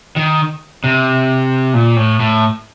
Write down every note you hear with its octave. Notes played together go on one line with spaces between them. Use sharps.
D#3
C3
A#2
A2
A2